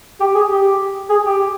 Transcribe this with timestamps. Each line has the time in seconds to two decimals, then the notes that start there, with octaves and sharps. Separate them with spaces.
0.20 G4
0.35 G#4
0.51 G4
1.10 G#4
1.25 G4